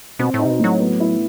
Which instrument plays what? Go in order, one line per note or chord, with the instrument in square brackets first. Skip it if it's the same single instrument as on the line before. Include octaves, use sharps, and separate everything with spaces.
[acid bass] B2 [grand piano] C4
[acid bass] A2
[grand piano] D#4
[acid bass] C3
B2
[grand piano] A2 [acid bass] F#3
[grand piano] B3
E4